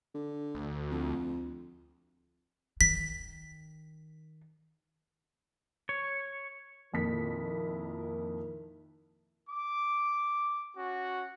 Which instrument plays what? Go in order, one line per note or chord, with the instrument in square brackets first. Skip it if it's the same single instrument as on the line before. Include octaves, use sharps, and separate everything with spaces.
[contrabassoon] D3
[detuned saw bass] D2
[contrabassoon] F2
[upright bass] D#3 [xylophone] B6
[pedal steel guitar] C#5
[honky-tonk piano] F2 A#2 B6 [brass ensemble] D#3 E4 A#4
[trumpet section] D6
C#4 F#4